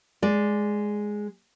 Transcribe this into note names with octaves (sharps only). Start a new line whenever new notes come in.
G#3 D5